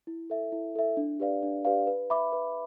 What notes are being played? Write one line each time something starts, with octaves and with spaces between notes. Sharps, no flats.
E4
A4 E5
E4
A4 E5
D4
G4 B4 D5 F5
D4
G4 B4 D5 F5
B4
E5 B5 D6
B4